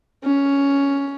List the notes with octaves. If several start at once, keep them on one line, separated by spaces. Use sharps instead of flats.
C#4